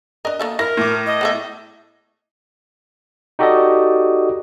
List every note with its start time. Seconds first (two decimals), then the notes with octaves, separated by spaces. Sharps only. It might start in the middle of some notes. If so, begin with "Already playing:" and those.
0.25 D4 A#4 D#5
0.39 A#3 A4 E5
0.59 E4 A#4 A#6
0.77 A2 D6
1.06 D#5
1.21 B3 A4 E5
3.39 D#4 F#4 G4 A4 D5 D#5